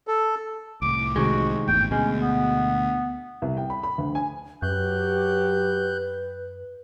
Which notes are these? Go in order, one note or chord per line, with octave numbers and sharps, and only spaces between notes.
A4
C2 A2 D6
C3 D#3 G#3 F#4
G#1 E2 A2 G5
D2 B2 G#3 C#4
B3
C2
G5
B5
B5
D2
G#5
F#2 F#3 G4 B4 F#6 G6